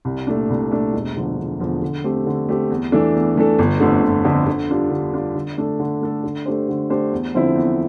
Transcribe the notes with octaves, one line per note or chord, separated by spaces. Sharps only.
C2
A#2 A3 D4
C2
A#2 A3 D4
E1
E2 D3 F3
E1
E2 D3 F3
D3
A3 C4 G4
D3
A3 C4 G4
E2
E3 A3 D4 A4
E2
E3 A3 D4 A4
G1
F2 D3 A3 D4
G1
F2 D3 A3 D4
D3
G3 D4 F4
D3
G3 D4 F4
D3
A3 D4 A4
D3
A3 D4 A4
D3
A3 D4 G4 C5
D3
A3 D4 G4 C5
E2
D3 F3 C4 E4
E2